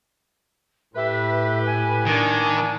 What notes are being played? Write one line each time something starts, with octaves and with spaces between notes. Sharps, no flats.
A2 G4 A4 B4 E5
G#5
D#3 A#3 D4